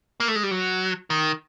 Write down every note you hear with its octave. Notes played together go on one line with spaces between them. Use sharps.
A#3
A3
G#3
G3
F#3
D#3